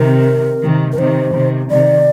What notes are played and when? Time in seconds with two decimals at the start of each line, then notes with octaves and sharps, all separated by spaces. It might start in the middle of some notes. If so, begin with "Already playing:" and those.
Already playing: C3 D#3 A#4
0.63 C3 D#3
0.92 A#4
0.98 C3 D#3 C5
1.34 C3 D#3
1.70 C3 D#3 D5